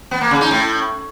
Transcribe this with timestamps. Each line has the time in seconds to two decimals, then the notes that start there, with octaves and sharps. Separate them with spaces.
0.11 B3
0.21 A#3
0.31 C#3
0.41 D#4
0.51 A2